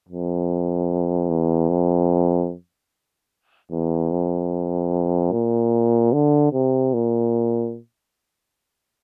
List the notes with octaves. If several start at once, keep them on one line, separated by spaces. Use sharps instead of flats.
F2
E2
F2
E2
F2
A#2
D3
C3
A#2